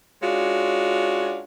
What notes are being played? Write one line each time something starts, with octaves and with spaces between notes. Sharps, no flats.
G#3 C#4 D4 F4 F#4